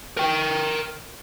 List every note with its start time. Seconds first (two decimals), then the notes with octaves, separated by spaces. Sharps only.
0.17 A#4 G5